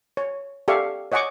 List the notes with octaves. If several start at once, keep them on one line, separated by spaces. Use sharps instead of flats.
C#5
G4 A4 D5 E5 F5 C#6
C#5 D#5 F#5 G#5 C#6 D6